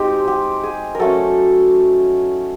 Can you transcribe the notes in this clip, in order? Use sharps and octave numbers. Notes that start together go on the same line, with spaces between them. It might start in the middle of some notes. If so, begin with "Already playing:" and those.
Already playing: G#3 C4 D#4 G4
G4
G#4
A#4
F#3 A3 C#4 A4